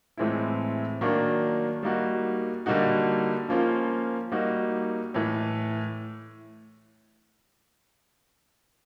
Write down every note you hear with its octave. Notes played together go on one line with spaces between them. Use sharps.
A2 E3 G#3 C4 E4
D#3 F#3 A#3 D4
G3 A#3 D#4 F#4
D3 G3 A#3 D#4 F#4
F3 A#3 C#4 F4
G3 A#3 D#4 F#4
A2 E3